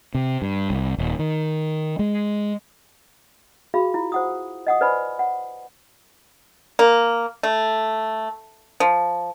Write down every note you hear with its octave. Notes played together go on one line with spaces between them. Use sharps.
C3
G2
C2
D#1
D#3
G#3
F#4 G#4 F5 B5
E4 F4
C5 F#5 D#6
D#5 F#5 D#6
B4 C5 D5 G#5 B5
F#5
A#3
A3
F3